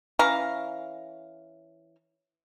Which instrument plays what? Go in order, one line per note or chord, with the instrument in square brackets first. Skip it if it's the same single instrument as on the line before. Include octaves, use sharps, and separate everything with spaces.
[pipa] E3 C#4 F5 A#5